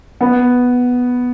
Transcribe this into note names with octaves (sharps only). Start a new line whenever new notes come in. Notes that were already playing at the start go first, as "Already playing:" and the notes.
B3